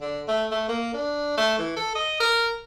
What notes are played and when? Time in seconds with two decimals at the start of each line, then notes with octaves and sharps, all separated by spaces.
0.01 D3
0.28 A3
0.51 A3
0.68 A#3
0.93 D4
1.37 A3
1.59 E3
1.76 A4
1.95 D#5
2.20 A#4